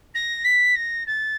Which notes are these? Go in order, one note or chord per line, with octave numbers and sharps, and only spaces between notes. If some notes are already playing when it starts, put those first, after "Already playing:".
A#6
B6
A#6
A6